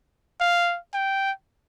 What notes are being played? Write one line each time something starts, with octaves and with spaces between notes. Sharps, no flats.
F5
G5